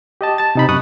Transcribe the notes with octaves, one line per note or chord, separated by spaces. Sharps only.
G4 D#5 A5
A5 A6
C3 D#4 B5
F#2 C#6 D#6 F#6